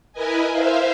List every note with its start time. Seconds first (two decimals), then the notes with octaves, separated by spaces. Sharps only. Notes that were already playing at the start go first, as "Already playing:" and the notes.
0.13 E4 A#4 B4 D#5 G#5
0.52 C5 E5 F5